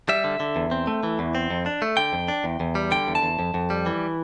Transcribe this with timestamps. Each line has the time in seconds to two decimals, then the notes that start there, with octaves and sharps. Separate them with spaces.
0.09 G3 E5
0.24 D3
0.40 D3
0.56 E2
0.71 C4
0.87 A3
1.03 E3
1.19 E2
1.35 C4
1.50 F2
1.66 D4
1.82 A3
1.97 D3 G5
2.13 F2
2.28 D4
2.44 E2
2.60 E2
2.75 G3
2.91 D3 G5
3.07 E2
3.15 A5
3.22 E2
3.39 F2
3.54 F2
3.70 G3
3.86 E3